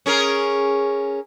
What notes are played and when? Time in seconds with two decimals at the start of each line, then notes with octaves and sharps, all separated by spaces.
0.06 C#4 G#4 A#4